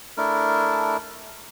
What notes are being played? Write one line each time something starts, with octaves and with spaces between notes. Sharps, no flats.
A3 D4 E4 A#4